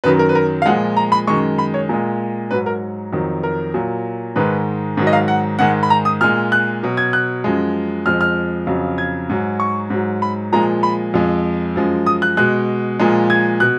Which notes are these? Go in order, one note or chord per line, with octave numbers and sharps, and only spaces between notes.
F#2 D#3 F#3 B4
A#4
B4
A#4
F5
A#2 F3 G#3 F#5
A#5
B5
F#2 D#3 G#3 C#6
B5
C#5
A#2 G#3
G#2 F#3 B4
A#4
F2 D#3 F#3
A#4
A#2 F#3
G#2 D#3 G#3 B4
G#2 D#3 F#3
D#5
F5
F#5
G#2 D#3 G#3 F#5
B5
A#5
D#6
A#2 G#3 F6
F#6
B2 F#3
G#6
F#6
F#2 F3 G#3
F2 F3 G#3 F6
F6
F2 C#3 F#3
G#6
G#2 F#3
C#6
G#2 F#3
B5
A#2 F3 G#3 A#5
B5
F2 F3 G#3
F#2 F3 G#3
D#6
F#6
B2 G#3 F#6
A#2 F3 G#3
G#6
B2 F#6